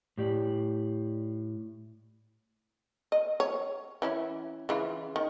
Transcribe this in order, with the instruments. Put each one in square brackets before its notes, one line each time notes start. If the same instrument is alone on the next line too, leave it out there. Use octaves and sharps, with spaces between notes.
[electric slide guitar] A2 G4 D5
[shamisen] D#5
C#5
E3 C#4 E4
C#3 E3 F4
D#3